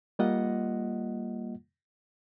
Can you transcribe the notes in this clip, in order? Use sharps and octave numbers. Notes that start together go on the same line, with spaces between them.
G3 A#3 F4 D#5 F#5